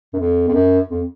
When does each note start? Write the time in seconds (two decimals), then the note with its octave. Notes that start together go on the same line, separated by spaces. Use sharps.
0.13 F#2
0.19 F2
0.48 F2
0.54 F#2
0.89 F2